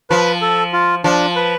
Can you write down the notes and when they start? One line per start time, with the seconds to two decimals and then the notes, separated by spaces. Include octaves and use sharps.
0.10 F3 B4
0.42 A4
0.73 F4
1.04 F3 D4
1.36 B4